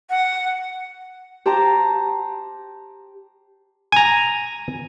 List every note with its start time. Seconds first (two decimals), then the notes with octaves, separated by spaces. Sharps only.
0.10 F#5
1.46 G4 C5 A5 A#5
3.92 G#5 A#5